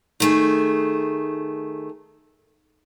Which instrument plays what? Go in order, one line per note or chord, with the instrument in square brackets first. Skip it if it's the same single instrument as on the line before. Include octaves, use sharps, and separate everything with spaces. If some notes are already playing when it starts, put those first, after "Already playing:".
[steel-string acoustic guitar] D#3 A3 G#4